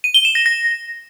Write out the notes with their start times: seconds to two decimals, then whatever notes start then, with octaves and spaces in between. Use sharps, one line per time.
0.04 D#7
0.14 G7
0.25 E7
0.35 A#6
0.46 A#6